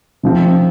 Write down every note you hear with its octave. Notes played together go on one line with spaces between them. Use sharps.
C3 F3 C4